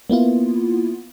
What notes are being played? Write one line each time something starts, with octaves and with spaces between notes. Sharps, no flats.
A#3 B3 E4 F4